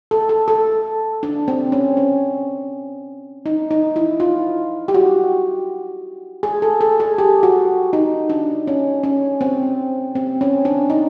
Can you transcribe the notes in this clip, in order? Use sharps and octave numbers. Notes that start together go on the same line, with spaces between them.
A4
A4
A4
D4
C4
C#4
C#4
D#4
D#4
E4
F4
G4
F#4
G#4
A4
A4
G#4
G4
F#4
D#4
D4
C#4
C#4
C4
C4
C#4
D4
D#4